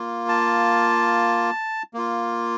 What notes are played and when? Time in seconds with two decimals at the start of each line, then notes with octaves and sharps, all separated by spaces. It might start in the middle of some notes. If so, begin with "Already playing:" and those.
Already playing: A#3 F4
0.29 A5
1.94 A#3 F4